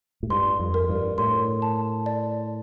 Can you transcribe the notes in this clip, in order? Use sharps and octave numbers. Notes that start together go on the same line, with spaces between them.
A2
G2 C6
F2
A#4
G2
A2 C6
A5
D5